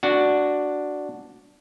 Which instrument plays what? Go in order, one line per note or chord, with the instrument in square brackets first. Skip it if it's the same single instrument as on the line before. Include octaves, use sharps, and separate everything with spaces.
[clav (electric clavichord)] D4 F#4